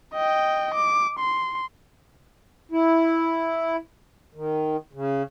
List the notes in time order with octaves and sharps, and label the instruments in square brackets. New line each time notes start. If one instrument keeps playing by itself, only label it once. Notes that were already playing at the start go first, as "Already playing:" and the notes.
[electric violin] D#5 G5
D6
C6
[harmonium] E4
D#3
C#3